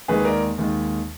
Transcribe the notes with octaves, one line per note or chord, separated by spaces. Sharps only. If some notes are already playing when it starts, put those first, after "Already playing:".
D#2 D#3 G#3 G#4 B4
A#4 D5
D#2 D#3 G#3